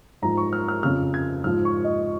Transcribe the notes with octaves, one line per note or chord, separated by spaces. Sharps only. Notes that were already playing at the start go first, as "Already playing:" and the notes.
G#2 F3 A#5
C#6
F6
F6
F2 C#3 F3 F6
G#6
G#2 F3 F6
C#6
D#5